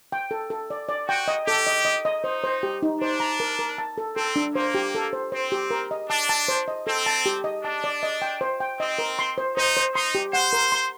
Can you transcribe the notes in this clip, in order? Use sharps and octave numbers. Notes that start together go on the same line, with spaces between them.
G5
A4
A4
D5
D5
F#4 G5
D#5
G4 A4
D#5
D#5
D#5
D#4 C5
C5
G4
D#4
D4 C5
A#5
A#4
A#4
A5
A4
C4 A4
D4
A#3 C5
G4
A4
C5
C4 C5
G4
A#4
D#5
D4 A5
A5
C5
D#5
C4 A4
A5
G4
D#5
D4 A5
D5
D#5
G5
C5
G5
C4 D#5
A#4
C6
C5
D#4 C5
C5
D#4 C6
G4
C5 F#5
A#4
C6